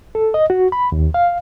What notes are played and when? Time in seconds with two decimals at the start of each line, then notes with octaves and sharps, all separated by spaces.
0.15 A4
0.34 D#5
0.50 F#4
0.72 B5
0.92 D#2
1.14 F5